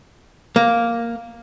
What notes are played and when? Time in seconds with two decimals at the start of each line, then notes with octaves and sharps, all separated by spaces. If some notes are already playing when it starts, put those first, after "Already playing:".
0.56 A#3